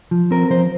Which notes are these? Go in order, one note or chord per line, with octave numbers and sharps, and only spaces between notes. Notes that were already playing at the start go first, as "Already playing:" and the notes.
F3
C4 A#4
F3 C5